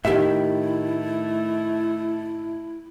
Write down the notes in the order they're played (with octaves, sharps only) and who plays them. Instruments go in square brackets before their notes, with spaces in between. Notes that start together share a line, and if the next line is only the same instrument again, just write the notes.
[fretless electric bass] A2 D#3 [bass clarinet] A3 [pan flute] E4 [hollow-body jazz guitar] G4 E5